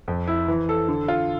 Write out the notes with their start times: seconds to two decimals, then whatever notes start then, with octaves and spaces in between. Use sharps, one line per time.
0.08 F2
0.28 E4
0.48 E3
0.69 A4
0.88 D3
1.08 F4